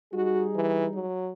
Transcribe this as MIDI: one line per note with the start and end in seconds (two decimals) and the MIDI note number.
0.13 1.03 55
0.13 1.03 63
0.13 0.45 66
0.13 1.03 68
0.55 0.86 52
0.94 1.32 54